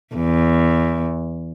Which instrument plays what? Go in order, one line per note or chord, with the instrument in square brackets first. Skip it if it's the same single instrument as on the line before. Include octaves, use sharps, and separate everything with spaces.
[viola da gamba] E2